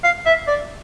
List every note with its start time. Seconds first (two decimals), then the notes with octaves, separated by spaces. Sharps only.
0.04 F5
0.26 E5
0.48 D5